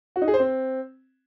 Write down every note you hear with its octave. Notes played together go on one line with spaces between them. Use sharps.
F#4
D#4
G#4
C5
C4